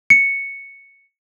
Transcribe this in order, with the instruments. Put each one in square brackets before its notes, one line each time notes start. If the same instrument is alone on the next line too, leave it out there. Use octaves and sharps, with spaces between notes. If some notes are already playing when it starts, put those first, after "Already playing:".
[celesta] C#7